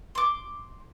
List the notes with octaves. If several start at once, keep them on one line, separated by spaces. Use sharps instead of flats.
C6 D6